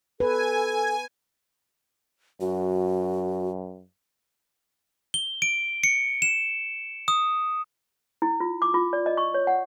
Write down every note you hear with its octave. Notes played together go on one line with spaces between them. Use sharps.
A4 B4 G#5
F#2 F#4
G7
D7
C#7
E7
D#6
E4
F4
D6
F4
D5
D#5
C#6
C#5
F#5